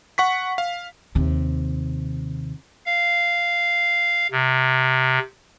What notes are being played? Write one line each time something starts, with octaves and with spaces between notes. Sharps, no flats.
F#5 C#6 B6
F5
D#2 C3
F5
C3